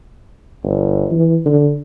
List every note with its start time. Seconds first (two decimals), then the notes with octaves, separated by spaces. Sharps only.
0.64 G1
1.12 E3
1.46 D3